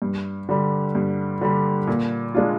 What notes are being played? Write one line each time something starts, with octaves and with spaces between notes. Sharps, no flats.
G2
D3 G3
G2
D3 G3
A#2
G#3 D4 F4